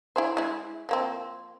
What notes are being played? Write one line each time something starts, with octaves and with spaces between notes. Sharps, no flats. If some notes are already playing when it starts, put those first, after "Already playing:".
E4 G#4 C5
G#3 E4
F3 A#3 C4